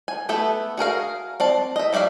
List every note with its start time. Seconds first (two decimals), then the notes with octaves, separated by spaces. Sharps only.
0.08 G#5
0.29 A3 B3 A4 E5
0.77 F#4 G#4 A#4 F5
1.40 C4 D5 A5
1.76 D#5 E5
1.93 F#3 G4 D5 E5 F5